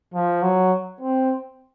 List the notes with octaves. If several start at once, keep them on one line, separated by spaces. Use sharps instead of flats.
F3
F#3
C4